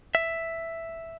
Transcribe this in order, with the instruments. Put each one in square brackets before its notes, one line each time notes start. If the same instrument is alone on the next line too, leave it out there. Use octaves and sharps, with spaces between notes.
[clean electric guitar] E5